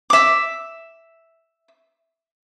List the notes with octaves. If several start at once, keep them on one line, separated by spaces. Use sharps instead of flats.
E5 D6